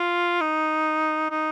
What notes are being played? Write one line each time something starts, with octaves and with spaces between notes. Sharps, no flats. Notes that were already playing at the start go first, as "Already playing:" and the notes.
Already playing: F4
D#4
D#4